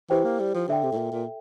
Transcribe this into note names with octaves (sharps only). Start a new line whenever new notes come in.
E3 E4 G4 C5 G5
A#3
G3
F3
D3 A4 E5 G5
C3
A2
A#2
A#2